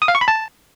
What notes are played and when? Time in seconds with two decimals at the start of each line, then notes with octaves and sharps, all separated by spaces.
0.02 D#6
0.08 F5
0.15 C#6
0.21 B5
0.28 A5